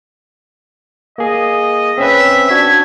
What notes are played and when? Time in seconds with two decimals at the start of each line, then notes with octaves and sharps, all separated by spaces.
1.18 A#3 G#4 D#5
1.98 C4 C#4 B4 E5
2.49 D4 F#4 G#6 B6